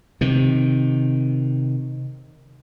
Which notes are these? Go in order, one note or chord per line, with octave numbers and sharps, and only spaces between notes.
C3 D#3